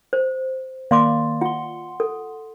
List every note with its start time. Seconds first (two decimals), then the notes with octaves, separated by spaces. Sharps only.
0.13 C5
0.91 D#3 A#3 D5 F5 C6 D6
1.41 F4 F#5 C6
2.00 A4